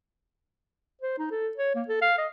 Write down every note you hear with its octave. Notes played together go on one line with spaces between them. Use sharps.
C5
D#4
A4
C#5
A#3
A4
F5
D#5